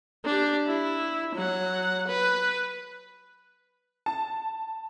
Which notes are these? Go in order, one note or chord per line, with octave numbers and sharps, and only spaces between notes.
D4 G4
E4
F#3 F#5
B4
A5